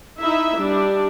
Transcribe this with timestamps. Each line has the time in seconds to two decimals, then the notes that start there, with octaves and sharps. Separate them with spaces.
0.20 D#4 E4 E5
0.57 G3 D4